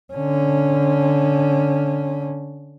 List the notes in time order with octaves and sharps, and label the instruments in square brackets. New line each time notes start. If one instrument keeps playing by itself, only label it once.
[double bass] D3 C#4